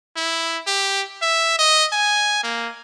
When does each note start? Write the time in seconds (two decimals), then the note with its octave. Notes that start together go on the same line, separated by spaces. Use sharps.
0.16 E4
0.67 G4
1.22 E5
1.59 D#5
1.93 G#5
2.43 A#3